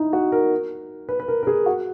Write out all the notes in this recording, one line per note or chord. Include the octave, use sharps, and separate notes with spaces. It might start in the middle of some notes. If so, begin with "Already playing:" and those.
Already playing: D#4 E4
F#4
A#4
B4
B4
A#4
A#4
G#4
F#4